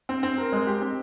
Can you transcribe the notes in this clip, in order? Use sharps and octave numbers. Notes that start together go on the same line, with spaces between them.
C4
C4
A#4
G#3
G4
C4